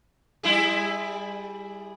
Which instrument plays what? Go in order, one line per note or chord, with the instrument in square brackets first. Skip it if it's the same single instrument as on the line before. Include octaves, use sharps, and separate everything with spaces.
[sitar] G3 E4 G#4